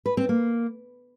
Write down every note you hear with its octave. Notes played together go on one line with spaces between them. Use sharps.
B4
C4
A#3